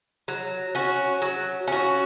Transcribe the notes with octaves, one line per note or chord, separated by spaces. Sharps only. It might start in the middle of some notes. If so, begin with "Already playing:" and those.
F#3
C#4 F#4
F#3
C#4 F#4